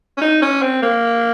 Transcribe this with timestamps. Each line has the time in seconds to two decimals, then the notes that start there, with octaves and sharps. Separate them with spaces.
0.17 C#4
0.21 D#4
0.42 C#4
0.62 C4
0.82 A#3